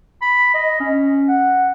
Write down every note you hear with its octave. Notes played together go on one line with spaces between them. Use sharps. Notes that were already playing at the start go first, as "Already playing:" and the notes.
B5
D#5
C#4
F#5